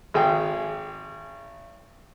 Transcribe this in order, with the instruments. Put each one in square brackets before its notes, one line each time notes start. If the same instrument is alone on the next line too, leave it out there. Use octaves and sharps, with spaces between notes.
[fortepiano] G#1 G#4 G5